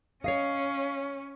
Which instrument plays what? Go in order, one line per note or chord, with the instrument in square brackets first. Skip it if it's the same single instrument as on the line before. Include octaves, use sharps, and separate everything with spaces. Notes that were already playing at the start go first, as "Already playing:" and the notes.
[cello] C#4 [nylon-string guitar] C#5 D#5 [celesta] F5 C7